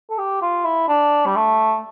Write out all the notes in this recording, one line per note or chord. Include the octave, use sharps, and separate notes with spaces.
A4
G4
F4
E4
D4
G3
A3